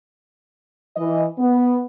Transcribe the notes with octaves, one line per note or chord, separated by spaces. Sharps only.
E3 D#5
B3